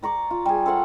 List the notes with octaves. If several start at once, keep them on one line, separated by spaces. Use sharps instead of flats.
D5 A#5 C#6 D6
F4
G3 G#4
A4 C5 F5 F#5